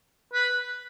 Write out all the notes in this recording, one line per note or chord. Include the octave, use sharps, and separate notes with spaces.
B4